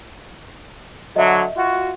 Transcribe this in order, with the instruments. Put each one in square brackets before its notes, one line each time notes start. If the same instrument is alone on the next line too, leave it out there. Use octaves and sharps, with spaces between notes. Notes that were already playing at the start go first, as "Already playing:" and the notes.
[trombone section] D3 F#3 [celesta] D#5 E5
[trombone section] F4 F#4